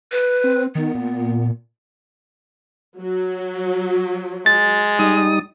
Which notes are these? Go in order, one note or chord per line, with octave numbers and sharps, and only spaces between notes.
B4
C4
D#3 B3
A#2
F#3
G#3 A6
G3 D#4 D#6